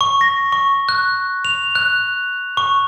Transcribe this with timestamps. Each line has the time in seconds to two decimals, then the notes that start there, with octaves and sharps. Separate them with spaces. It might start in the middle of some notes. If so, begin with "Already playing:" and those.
0.01 C#6
0.21 A#6
0.52 C#6
0.89 F#6
1.45 F7
1.75 F#6
2.57 C#6